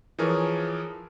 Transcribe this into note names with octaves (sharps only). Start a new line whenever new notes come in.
E3 F3 G#4 A#4 C#5